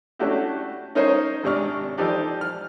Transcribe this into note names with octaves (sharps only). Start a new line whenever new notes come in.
A3 C#4 D4 E4 F#4 G4
C#4 D#4 A#4 C5 C#5
G#1 C3 D4 C#6 F6
E3 F3 D#4 G4 A4 D5
F6